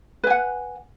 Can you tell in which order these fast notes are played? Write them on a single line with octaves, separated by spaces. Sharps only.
B4 G#5 F#5